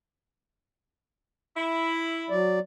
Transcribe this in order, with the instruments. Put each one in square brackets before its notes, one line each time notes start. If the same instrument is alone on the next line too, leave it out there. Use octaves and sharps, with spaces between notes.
[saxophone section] E4
[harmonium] F#3 D5